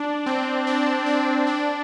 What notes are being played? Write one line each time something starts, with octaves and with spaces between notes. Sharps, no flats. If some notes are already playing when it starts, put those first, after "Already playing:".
Already playing: D4
C4
D4
D4
D4